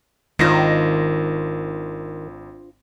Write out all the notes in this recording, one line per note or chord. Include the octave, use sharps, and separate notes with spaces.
G#1 D#3 D4 F4 C5 A#6